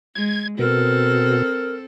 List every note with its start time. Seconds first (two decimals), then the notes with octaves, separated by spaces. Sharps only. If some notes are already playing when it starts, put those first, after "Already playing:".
0.15 G#3 G#6
0.59 B2 C4 A4 A#4